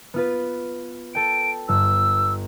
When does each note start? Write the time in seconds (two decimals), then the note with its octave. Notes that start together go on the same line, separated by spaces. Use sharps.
0.14 B3 F4 B4
1.15 A4 G5 D7
1.69 G1 E6